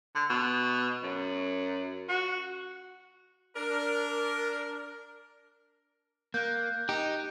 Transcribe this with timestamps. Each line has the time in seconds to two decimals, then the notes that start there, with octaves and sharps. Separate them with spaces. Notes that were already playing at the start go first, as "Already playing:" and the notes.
0.15 D3
0.30 B2
1.03 F#2
2.09 F#4
3.56 D4 A#4
6.34 A#3 F#6 G6
6.89 D#4 G4